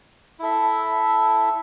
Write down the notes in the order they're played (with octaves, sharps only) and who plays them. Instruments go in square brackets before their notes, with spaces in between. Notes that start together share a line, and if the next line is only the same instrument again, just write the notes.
[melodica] E4 A4 E5